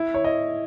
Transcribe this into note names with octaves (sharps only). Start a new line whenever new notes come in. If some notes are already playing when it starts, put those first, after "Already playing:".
Already playing: E4
C#5
D#5